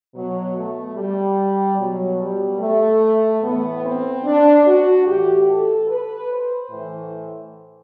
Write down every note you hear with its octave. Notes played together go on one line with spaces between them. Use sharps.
B2 F#3
A3
G3
B2 F#3
G3
A3
A2 E3 B3
C4
D4
F#4
A2 E3 G4
A4
B4
C5
A2
E3